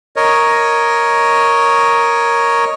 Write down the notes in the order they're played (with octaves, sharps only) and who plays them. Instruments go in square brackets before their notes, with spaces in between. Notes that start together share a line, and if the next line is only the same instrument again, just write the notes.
[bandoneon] A#4 C#5 D#5